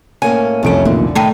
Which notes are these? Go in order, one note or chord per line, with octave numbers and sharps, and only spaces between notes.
A2 A#3 C#4 G#5
C2 F2 D#3 A3 C#4 D7
A1 A#2 D3 D#3
A2 D#3 A3